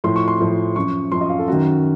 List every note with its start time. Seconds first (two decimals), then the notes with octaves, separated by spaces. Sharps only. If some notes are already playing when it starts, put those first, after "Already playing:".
0.04 A2 F3 C6
0.16 C#6
0.28 C6
0.40 A2 F3
0.76 F#2 F3 C#6
1.12 F#2 F3 C6
1.21 D#5
1.30 F5
1.39 A4
1.48 F#2 D#3 F#4